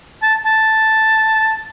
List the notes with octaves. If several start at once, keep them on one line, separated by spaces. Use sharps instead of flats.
A5
A5